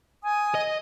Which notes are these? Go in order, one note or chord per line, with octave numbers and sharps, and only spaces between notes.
G#5 D#6
D#5